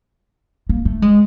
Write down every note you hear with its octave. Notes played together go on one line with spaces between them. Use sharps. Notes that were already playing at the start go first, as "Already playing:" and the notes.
A#3
A3
G#3